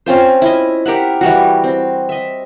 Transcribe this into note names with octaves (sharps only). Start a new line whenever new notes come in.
C4 C#4 F4 C5
E4 D#5
G4 A#4 E5 F#5
E3 G3 F#4
C4
D#5 E5